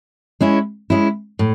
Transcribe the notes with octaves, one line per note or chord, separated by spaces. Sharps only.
G#3 C#4 E4
G#3 C#4 E4
A2